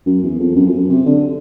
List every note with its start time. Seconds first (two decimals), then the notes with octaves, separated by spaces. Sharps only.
0.06 F#2
0.23 E2
0.39 F2
0.56 F#2
0.67 F2
0.73 F#2
0.89 C3
1.06 D3